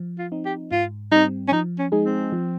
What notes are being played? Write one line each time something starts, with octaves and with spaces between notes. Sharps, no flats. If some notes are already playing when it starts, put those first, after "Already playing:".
Already playing: F3
F4
C4 D#4
G4
G#2 F4
G3 C4 D#4
C#4
F3 D#4
C#4
G#3 D#4 G#4
C4
F3